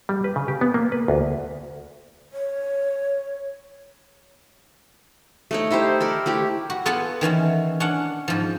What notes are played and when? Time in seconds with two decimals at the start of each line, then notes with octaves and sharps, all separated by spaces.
0.09 G3
0.24 B4
0.36 C#3
0.48 G4
0.61 B3
0.74 A#3
0.92 B4
1.08 D2
2.33 C#5
5.51 A3 D#4 C#5
5.71 D#4 E4 G4 C5
6.00 A4 A#4 D5
6.26 A3 E4 G4
6.70 F#4
6.86 B3 F4 A4 B4 F#5 G#5
7.21 D#3 E3 C#4 E4
7.80 C#4 D4 F#5
8.28 G#2 F3